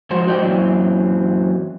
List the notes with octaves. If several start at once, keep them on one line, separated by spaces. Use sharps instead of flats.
G#2 F3 F#4 C5
F#4 C5 D5 D#5 F5 G5
F#2 A#2 E3 F#3 C4